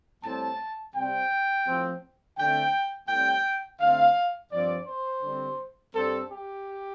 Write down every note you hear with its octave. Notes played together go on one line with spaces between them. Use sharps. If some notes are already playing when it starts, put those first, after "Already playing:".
A2 G3 C4 A5
C3 G3 C4 G5
A2 F3 C4
D3 A3 C4 G5
A2 G3 C4 G5
D3 A3 C4 F5
G2 F3 C4 D5
C5
D3 G3 C4
G2 G3 C4 A4
G4